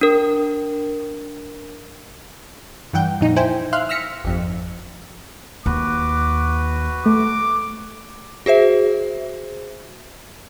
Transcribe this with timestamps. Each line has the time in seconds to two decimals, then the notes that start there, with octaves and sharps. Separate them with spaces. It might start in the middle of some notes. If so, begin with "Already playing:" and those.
0.01 D4 A#4
2.93 G2 E3 F#5 G5 G6
3.21 F2 A#2 D#4
3.36 E4 C5 G5 G#5
3.73 E5 F5 C6 F6 F#6
3.89 E6 F6 A#6 B6 C#7
4.24 G#1 F2
5.66 D#2 F#4 B4 D6
7.06 A3 D6
8.46 F#4 G#4 C5 E5